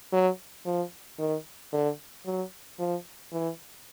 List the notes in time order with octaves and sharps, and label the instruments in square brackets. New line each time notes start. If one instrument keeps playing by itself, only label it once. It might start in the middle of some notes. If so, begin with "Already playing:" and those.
[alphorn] F#3
F3
D#3
D3
F#3
F3
E3